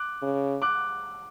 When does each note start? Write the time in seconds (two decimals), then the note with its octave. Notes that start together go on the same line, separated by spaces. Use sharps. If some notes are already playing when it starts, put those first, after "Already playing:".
Already playing: D6 F#6
0.22 C#3
0.62 D6 F#6